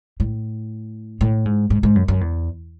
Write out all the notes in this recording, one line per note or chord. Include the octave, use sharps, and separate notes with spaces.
A2
A2
G#2
G#2
G#2
F#2
F#2
E2